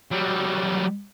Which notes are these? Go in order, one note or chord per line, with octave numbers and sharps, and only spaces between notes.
F#3 G3